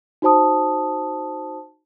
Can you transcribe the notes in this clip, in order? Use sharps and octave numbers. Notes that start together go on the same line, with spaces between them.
D#4 F#4 C5 A5 D#6